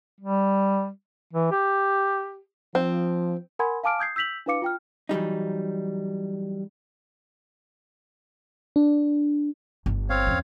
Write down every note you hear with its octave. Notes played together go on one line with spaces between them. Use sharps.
G3
E3
G4
F3 C4
A#4 F#5 G#5 B5 C6 G#6
F5 G#5 A5 D6 F6 D7
D#6 G6 G#6 C7
E6 G6 B6 F7 F#7
D4 E4 B4 F5 D6 C#7
F4 G5 F6
E3 F#3 G3 D#4
D4
G1
C4 C#5 F5
E2 C#4